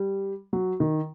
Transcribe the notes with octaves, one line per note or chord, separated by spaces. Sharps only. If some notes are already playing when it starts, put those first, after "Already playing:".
Already playing: G3
F#3
D#3